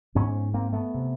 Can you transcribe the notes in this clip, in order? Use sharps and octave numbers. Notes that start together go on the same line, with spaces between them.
G#2 B3 C#4
A#3 C4
A3 B3
C3